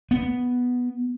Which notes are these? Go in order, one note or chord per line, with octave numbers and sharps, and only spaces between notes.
B3